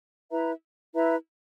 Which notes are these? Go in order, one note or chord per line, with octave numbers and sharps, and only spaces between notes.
E4 B4 E5 A#5
E4 B4 E5 A#5